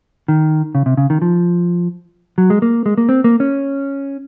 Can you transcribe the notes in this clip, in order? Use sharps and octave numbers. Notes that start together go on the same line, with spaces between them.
D#3
C#3
C3
C#3
D#3
F3
F#3
G#3
A#3
G#3
A#3
C4
A#3
C#4